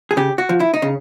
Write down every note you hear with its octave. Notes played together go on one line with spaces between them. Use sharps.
G#4
C#3 G4
F#4
F3
E4
D#4
C#3